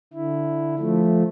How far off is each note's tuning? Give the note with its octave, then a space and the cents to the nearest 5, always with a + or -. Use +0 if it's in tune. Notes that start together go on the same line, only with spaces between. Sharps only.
D3 +0 E4 +0
F3 +0 A3 -10